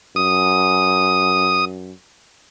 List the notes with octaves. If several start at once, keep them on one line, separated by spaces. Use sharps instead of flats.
F#2 D#6